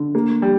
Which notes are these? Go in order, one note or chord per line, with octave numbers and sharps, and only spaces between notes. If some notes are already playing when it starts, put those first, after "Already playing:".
Already playing: D3
A#3
G3